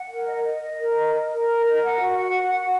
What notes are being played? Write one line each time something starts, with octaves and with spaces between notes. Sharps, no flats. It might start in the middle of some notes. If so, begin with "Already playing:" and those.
Already playing: F#5
A#4
D#5
D#5
D#5
A#4
D#5
A#4
A#4
D#5
A#4
F#5
F#4
F#5
F#4
F#5